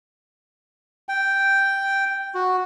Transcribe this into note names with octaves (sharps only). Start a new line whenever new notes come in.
G5
F#4